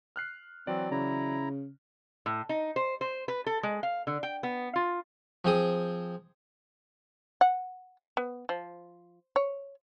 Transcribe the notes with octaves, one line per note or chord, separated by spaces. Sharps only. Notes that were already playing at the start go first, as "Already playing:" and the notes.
F6 F#6 C7
E3 F#3 C4 D5
C#3 E4 A#5
A2
D#4
C5
C5
B4
A4
G#3
F5
D3
G5
B3
F4
F3 C4 G#4 D#6
F#5
B3
F3
C#5